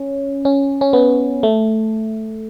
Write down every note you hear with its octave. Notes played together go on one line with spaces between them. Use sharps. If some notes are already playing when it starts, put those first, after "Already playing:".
Already playing: C#4
C#4
C#4
B3
A3